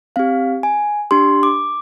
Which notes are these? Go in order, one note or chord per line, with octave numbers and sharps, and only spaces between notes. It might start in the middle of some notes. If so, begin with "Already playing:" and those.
C4 G4 F5
G#5
D4 G4 C6
D6